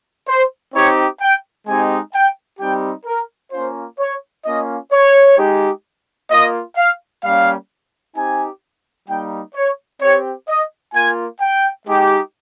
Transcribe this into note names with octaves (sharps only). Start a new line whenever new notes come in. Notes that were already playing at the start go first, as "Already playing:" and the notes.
C5
C4 D#4 G4 C#5
G5
G#3 C4 D#4 G4 G#5
G5
G3 C4 D#4 G4 G5
A#4
A#3 C#4 F4 C5
C#5
A#3 C#4 F4 D#5
C#5
G#3 D#4 G4
A#3 F4 D#5
F5
G3 A#3 C#4 F5
C4 D#4 G4 G#5
G3 A#3 D#4 G5
C#5
C4 G4 C#5
D#5
A#3 F4 G#5
G5
G#3 D#4 G4